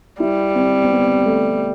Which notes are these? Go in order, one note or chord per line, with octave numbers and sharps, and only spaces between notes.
G3 E4
C4
C4
B3
A3